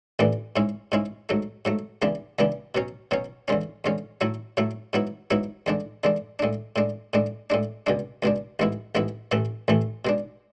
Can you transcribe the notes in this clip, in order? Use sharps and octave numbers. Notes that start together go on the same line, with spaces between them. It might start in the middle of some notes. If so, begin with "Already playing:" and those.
A1 A2 E3 B3 D4
G#2 G#3 C#4 E4
G#2 G#3 C#4 E4
G#2 F#3 A3
G#2 F#3 A3
C#2 C#3 E3 B3 D4
C#2 C#3 E3 B3 D4
B2 F#3 C#4
B2 F#3 C#4
E2 D3 G#3 C#4
E2 D3 G#3 C#4
A2 F#3 A3 E4
A2 F#3 A3 E4
G#2 F#3 B3 E4
G#2 F#3 B3 E4
E2 D3 G#3 D4
E2 D3 G#3 D4
A2 G#3 D4
A2 G#3 D4
A2 G#3 D4
A2 G#3 D4
C#2 B2 G#3 D4
C#2 B2 G#3 D4
A1 G#2 G#3 B3 E4
A1 G#2 G#3 B3 E4
A1 A2 E3 A3
A1 A2 E3 A3
B2 G#3 D4